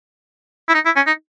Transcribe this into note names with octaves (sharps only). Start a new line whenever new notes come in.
E4
D#4
E4
C#4
D#4